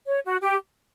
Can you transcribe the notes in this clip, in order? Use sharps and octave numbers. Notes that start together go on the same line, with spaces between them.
C#5
F#4
G4